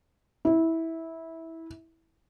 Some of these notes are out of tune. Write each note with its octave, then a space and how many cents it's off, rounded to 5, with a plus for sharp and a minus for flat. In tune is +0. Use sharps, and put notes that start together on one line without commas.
E4 -15